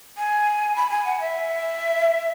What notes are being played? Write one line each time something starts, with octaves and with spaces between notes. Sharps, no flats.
G#5
B5
G#5
F#5
E5